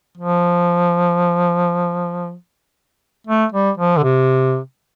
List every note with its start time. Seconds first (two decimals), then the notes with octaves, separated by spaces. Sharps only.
0.18 F3
3.27 A3
3.52 G3
3.78 F3
3.97 D3
4.04 C3